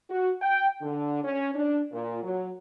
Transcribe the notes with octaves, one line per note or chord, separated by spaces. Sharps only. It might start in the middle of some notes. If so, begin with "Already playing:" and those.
F#4
G5
D3
C#4
D4
A#2
F#3